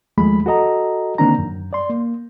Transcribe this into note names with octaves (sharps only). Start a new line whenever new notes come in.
D#2 F3 G#3 A3 B5
F#4 A4 D#5 A#5
D3 D#3 A#3 C4 D4 A#5
F#2
D5 C6
A#3